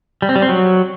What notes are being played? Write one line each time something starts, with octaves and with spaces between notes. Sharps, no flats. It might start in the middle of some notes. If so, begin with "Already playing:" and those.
G3
C4
G3
C4
F#3